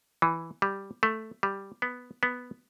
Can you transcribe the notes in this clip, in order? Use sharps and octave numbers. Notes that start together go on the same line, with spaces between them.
E3
G3
A3
G3
B3
B3